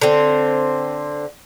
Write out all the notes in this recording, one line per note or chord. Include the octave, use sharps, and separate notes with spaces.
D3 C4